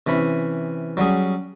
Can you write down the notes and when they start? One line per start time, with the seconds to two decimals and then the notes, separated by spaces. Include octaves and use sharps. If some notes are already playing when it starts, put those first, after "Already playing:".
0.07 C3 E3 C#4 B5
0.97 F#3 G3 C#4 G#4